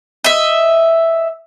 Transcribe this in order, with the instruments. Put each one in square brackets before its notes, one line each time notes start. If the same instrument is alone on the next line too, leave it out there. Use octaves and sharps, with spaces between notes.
[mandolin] D#5 E5